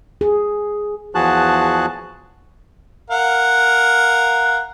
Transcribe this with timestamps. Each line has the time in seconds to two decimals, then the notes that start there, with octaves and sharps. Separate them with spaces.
0.21 G#4
1.15 E2 F3 F#4 G#4 A5 F#6
3.10 A#4 F5 F#5